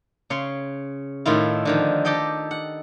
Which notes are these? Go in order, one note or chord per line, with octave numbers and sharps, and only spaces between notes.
C#3 C#5 C6
A2 D#3 E4 F4
D3 D#3 F3
G4 A4 D#5 G5
F#5